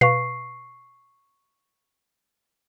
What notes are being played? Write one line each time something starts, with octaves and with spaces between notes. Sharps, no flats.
B2 B4 F5 C#6 C7